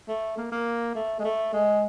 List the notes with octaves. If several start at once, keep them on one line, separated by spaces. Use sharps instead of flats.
A3
A#3
A#3
A3
G#3
A3
G#3